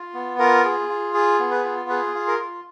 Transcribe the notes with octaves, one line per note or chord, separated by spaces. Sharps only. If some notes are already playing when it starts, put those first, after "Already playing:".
Already playing: F4
B3
F4 A#4
G#4
F4
G#4
B3
B4
F4
G#4 B4
F4
A#4
F4